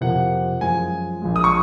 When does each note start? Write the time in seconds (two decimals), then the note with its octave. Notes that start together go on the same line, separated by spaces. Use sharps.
0.01 F2 C3 F3 A#3 F#5
0.61 F#2 F3 G#3 G#5
1.22 A#1 A#2 G#3
1.36 D#6
1.44 C#6